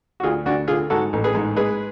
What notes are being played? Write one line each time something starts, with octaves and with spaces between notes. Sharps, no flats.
F#4
D2 F4 G#4
D2 D4 F#4
D3 F4 G#4
G#2 F#4 A4
A1
G#4 B4
G#2
G#3 G#4 B4